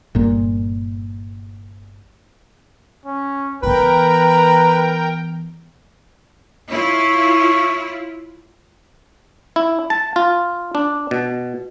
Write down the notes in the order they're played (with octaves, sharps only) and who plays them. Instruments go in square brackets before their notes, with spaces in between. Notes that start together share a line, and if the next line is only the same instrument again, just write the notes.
[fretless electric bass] G1 A#2
[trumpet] C#4
[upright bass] E3 B3 [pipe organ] A#4 G5 [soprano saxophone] B4 [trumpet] A#5
[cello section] E4 F4 [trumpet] C#5
[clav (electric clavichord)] E4
A5
F4
D4
B2